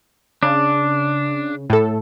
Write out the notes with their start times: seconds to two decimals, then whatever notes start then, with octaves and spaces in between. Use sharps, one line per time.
0.43 C#3 D4
1.70 A2 A4